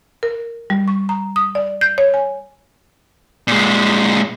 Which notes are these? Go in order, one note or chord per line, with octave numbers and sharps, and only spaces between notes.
A#4
G3
C#6
A#5
D#6
D5
G6
C#5
G#5
A#2 G#3